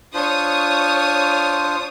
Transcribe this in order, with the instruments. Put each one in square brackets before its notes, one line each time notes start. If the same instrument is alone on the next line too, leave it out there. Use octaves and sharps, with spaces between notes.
[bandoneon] D4 F4 C5 [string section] C#5 D#6